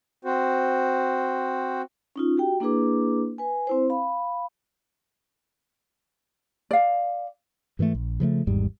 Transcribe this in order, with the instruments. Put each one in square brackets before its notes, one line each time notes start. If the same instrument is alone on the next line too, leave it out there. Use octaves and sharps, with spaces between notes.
[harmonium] C4 F#4 C5
[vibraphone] C#4 D#4 F4
F#4 G4 G5
A#3 D4 E4 G#4 B4 D6
B4 G#5
C4 E4 C5
F5 B5
[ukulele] D5 F5
[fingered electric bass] G#2 E3 G#3 A3
A#1
C#3 F3 G#3 A3
G#1 E2 G#2 G3